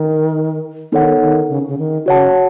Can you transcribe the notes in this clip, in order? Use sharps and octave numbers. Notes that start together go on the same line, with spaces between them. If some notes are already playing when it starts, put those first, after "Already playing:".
Already playing: D#3
D#3 B3 D#4 A4 C#5 F#5
D#3
C#3
C#3
D#3
C#3 F#4 C#5 F#5 A5